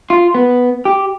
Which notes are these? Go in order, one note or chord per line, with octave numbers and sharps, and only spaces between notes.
F4
B3
G4